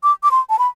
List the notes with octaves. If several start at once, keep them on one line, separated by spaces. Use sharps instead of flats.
D6
D6
C6
A5
B5